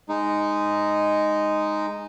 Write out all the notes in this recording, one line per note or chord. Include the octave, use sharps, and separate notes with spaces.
G#3 D#4